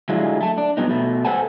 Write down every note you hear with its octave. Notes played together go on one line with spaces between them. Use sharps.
D3 F#3 G#3 E4 F4
A3 A5
D4
F2 C3 F#3 B3 D#4
B2 A3
A4 B4 C5 F#5 G#5 A5